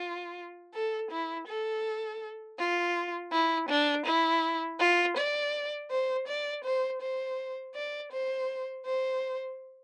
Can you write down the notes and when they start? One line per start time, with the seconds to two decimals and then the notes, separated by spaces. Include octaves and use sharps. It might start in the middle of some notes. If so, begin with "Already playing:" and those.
Already playing: F4
0.74 A4
1.11 E4
1.48 A4
2.59 F4
3.32 E4
3.69 D4
4.06 E4
4.79 F4
5.17 D5
5.90 C5
6.28 D5
6.64 C5
7.01 C5
7.75 D5
8.12 C5
8.85 C5